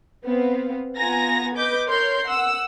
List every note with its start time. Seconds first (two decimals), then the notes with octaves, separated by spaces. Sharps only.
0.25 B3 C4 F5
0.98 B3 F4 F#5 G#5 A#5 A#6
1.55 B4 D#5 D6 G6
1.88 A#4 C#5 C6 G6
2.26 F#5 E6